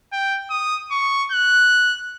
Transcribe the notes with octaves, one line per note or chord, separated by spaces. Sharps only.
G5
D#6
C#6
F#6